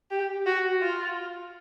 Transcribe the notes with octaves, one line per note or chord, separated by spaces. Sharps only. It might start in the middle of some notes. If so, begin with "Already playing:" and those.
G4
F#4
F4